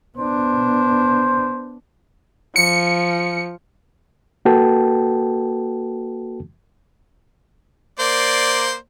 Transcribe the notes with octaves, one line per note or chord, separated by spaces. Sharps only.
B3 D4 C5
F3 C#7
A#3 F#4 A4 B4 G5 A5
A#3 C5 D5